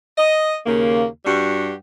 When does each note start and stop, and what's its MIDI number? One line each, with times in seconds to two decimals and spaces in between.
0.18 0.57 75
0.66 1.05 39
0.66 1.05 49
0.66 1.05 58
1.25 1.73 43
1.25 1.73 55
1.25 1.73 66
1.25 1.73 67